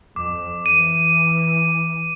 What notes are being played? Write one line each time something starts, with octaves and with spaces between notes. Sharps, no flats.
F2 D6
E3 D#7